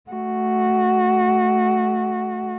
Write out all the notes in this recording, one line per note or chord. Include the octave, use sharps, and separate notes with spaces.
A3 F#4